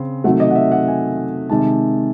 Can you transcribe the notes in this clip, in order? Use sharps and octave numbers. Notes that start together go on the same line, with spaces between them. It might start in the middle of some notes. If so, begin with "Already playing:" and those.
Already playing: C#3 C4
C3 D#3 F#3 A3 F#5
D#5
F#5
E5
F#5
G#5
C3 D#3 G#3 A5